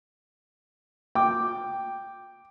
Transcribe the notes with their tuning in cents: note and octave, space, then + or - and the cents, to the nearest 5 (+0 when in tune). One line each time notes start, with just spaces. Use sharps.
G5 +0 D6 +0